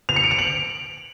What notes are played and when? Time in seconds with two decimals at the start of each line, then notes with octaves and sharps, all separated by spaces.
0.09 F7
0.16 C#7
0.24 D7
0.31 F7
0.39 F#7